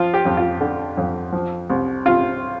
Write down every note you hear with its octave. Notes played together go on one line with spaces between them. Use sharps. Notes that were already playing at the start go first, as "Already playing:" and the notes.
Already playing: F3 F4
G4
F2
F4
D3
F2
F3
C2
C3 F4